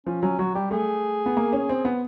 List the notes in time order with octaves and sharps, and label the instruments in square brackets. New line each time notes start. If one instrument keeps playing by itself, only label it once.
[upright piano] F3 [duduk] C#4
[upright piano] F#3 [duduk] C#4
[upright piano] F#3 [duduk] F#4
[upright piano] G3 [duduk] G4
[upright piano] A3 [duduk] G#4
[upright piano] B3
A#3
C#4
C4
B3